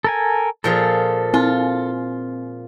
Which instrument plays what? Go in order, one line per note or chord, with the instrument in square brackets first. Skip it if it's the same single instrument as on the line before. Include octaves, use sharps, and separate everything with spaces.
[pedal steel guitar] A4 A#4 G#5
[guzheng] A#2 F3 G#4 [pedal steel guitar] A4
[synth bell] C4 [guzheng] F4